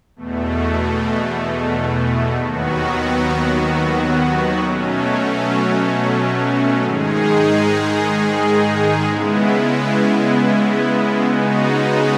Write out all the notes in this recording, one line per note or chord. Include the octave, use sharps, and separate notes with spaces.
E2 B2 A3
D#2 D#3 F#3 B3 F#4
B2 F#3 A3 C#4
G#2 D#3 G#3 D#4 G#4
C#3 G#3 B3 E4
C#3 G#3 B3 D#4 F#4